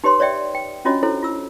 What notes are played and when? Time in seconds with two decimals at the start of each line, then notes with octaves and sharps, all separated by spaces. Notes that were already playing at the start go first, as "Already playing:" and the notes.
0.04 D#4 G4 B4 C#5 C6
0.20 C#5 D5 E5 G5
0.55 G5
0.85 C#4 D4 F4 F#4 C#5 D#5
1.03 E4 A4 C5 C#5
1.23 F4 E6